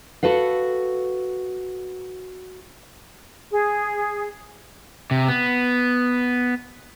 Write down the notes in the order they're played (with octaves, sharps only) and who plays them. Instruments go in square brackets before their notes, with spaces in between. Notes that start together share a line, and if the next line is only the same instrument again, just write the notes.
[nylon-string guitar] F#4 A4 B4 F5
[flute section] G#4
[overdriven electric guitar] C3
B3